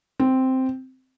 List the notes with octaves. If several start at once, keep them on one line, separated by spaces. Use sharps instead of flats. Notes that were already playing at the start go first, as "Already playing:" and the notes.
C4